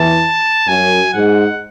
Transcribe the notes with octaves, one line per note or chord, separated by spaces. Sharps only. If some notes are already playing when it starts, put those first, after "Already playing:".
Already playing: E2 E3 A5
F#2 F#3 G#5
G#2 G#3 F#5